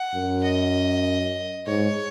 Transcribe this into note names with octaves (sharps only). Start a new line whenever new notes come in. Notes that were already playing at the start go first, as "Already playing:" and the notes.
Already playing: F#5
F#2
D#5
G#2 C#5